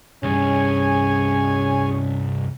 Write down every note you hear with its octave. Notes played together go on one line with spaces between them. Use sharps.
C2 G2 C#4 G#4 C#5 G#5